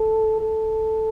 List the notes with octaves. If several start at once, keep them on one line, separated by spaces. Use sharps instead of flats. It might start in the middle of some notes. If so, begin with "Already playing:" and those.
Already playing: A4
A4